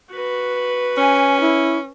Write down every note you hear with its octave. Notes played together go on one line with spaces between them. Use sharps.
F#4 B4
C#4 G#5
E4